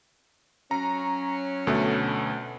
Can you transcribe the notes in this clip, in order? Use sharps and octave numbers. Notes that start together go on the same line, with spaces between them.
F#3 C#4 A#5
D2 B2 A3